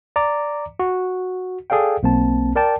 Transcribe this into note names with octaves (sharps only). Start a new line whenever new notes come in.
D5 A#5 D6
F#4
G#4 A4 D5 F5 G5
B1 A#3 C4 A5
A#4 D5 G5 A5